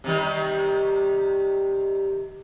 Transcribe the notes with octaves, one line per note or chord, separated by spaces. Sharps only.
C3 D#3 G3